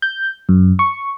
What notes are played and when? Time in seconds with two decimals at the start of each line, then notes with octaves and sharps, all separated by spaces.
0.02 G6
0.49 F#2
0.79 C#6